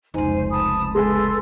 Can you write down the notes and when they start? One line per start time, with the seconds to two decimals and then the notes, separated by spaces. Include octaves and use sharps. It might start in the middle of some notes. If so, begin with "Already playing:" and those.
0.14 F1 C#2 D#4 C5 G#5
0.52 A5 B5 D#6
0.95 G#3 A4 B4 G#5 C6